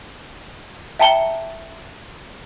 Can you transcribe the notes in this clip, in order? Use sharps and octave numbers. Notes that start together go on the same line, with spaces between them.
E5 G5 A5 A#5 C#7 G7